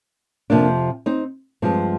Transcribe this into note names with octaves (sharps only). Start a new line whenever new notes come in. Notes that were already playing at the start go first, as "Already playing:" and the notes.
F2 C3 F3 A#3 D4
C4 D#4
G2 F3 G#3 C4